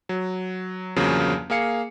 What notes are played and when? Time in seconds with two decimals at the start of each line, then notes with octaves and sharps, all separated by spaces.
0.09 F#3
0.96 E2 G2 C#3 F3 F#3 A#3
1.50 A#3 G#4 F5 C#7